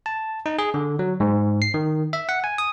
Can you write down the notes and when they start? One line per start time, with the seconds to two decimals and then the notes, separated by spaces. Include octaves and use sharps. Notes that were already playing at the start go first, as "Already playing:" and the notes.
0.06 A5
0.46 D#4
0.59 G#4
0.74 D3
0.99 F#3
1.20 G#2
1.62 C7
1.74 D#3
2.13 E5
2.29 F#5
2.44 G#5
2.58 D#6